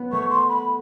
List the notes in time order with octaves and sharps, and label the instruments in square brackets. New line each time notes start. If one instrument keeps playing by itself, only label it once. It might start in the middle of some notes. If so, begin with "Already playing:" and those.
Already playing: [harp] B3
[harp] A3 [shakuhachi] C#6
[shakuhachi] C6
B5